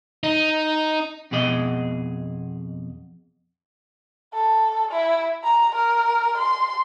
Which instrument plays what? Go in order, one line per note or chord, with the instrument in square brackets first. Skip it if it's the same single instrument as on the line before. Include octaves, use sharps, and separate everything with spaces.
[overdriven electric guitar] D#4
[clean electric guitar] F2 B2 G#4 D#5
[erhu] A4
E4
A#5
A#4
C6